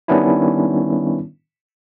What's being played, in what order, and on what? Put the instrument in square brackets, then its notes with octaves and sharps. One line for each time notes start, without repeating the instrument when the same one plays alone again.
[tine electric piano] D#3 G3 B3 C#4 D4 E4